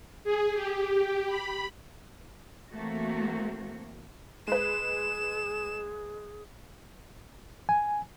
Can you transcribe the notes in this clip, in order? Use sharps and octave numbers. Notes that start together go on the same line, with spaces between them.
G#4
G4
B5
E3 A3 A#3 C4 F#4
G#3 G#4 B4 E7
G#5